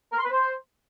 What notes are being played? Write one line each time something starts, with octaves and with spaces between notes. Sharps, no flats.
A#4
C6
B4
C5